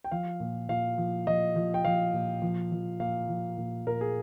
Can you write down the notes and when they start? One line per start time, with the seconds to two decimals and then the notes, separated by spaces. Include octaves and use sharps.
0.04 G5
0.12 F3 F5
0.40 A#2
0.69 A#2 F5
0.98 F3
1.27 F3 D#5
1.56 F3
1.74 G5
1.85 F3 F5
2.13 A#2
2.42 F3
2.72 F3
3.00 A#2 F5
3.29 F3
3.58 A#2
3.87 A#2 A#4
4.01 G#4